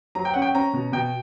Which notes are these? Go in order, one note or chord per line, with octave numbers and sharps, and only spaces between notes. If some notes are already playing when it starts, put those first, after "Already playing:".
F#3 A#5
G5
C#4 F#5
G5
C#4 A#5
B2
B2 G5